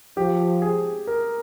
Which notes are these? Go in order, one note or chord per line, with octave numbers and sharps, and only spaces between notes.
F3 G4
G#4
A#4